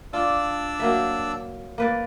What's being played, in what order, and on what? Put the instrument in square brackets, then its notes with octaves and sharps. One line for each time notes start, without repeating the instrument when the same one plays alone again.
[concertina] D4 D5 E6 [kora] F4
[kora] F#3 A#3 E5
A#3 B4 D5